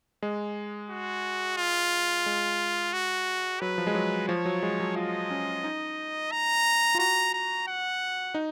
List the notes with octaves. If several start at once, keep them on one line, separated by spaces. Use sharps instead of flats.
G#3
F#4
F4
G#3
F#4
F#3 B4
F3
G#3
F#3
F3 C#5
F#3
G#3
F#3
F4 D#5
C#4
D#4
A#5
F4
F#4 A#5
A#5
F#5
D#4